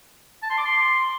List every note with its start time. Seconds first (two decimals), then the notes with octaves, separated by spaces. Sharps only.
0.42 A5
0.50 C6
0.57 D6
0.65 C6